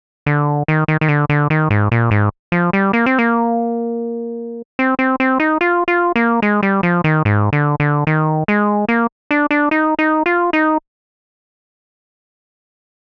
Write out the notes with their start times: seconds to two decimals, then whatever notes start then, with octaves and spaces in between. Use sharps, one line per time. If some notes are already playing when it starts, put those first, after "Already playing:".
0.26 D3
0.68 D#3
0.88 D#3
1.01 D#3
1.09 D3
1.29 D3
1.50 D#3
1.70 G#2
1.92 A#2
2.11 G#2
2.52 F3
2.73 G3
2.93 A#3
3.06 C4
3.19 A#3
4.79 C4
4.99 C4
5.20 C4
5.40 D#4
5.61 F4
5.88 F4
6.16 A#3
6.42 G#3
6.63 G3
6.83 F3
7.04 D#3
7.25 G#2
7.53 D3
7.80 D3
8.07 D#3
8.48 G#3
8.89 A#3
9.31 D4
9.51 D4
9.71 D#4
9.99 D#4
10.26 F4
10.53 D#4